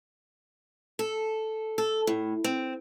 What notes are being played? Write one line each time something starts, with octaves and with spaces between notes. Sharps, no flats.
A4
A4
A2
C4